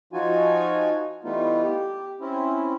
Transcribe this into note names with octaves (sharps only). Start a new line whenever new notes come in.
F3 D#4 F4 F#4 G#5
E3 G3 A3 B3 D#4 F4
G4
C4 C#4 E4